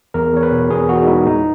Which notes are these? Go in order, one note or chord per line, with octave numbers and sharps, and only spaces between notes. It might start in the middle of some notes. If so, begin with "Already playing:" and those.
E2 A#4
E2 C#5
B4
B2
E2 G#4
E2 F#4
D#4
G#3 E4
A#2 D#4